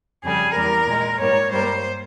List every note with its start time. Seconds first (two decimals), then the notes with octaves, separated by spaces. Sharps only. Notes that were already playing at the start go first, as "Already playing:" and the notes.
0.24 F2 C#3 G3 G#4
0.55 E2 E3 G3 A#3 A#4
0.87 A#2 G#3
1.19 G#2 G3 A#3 C#5
1.52 G2 G3 A#3 C5